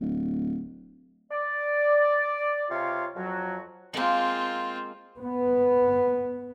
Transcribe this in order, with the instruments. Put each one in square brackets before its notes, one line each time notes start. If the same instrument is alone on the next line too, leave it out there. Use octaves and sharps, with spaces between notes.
[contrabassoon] D1
[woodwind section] D5
C#2 C3 F4 C#5 F5
F2 F#3 F#4
[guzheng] G#3 A#3 [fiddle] C4 F4
[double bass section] B3